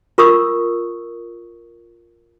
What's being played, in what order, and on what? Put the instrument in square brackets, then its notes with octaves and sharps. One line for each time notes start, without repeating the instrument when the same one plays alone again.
[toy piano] F4 A#4 C#6 D#6 E6